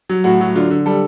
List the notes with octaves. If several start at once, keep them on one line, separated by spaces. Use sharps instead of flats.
F#3
A2 F#4
F#3
D3 F4
D3
G3 A4